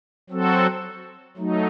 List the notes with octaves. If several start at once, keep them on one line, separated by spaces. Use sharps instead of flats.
F#3 C4 F#4 A4
F#3 A3 D#4